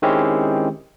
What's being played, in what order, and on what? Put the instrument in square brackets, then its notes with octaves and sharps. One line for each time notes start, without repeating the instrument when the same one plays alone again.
[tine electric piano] D#3 G#3 C4 C#4 E4 G4